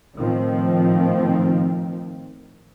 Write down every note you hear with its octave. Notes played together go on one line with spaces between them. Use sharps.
A2 D#3 F3 C4